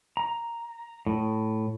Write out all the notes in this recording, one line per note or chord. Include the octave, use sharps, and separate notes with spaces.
A#5
A2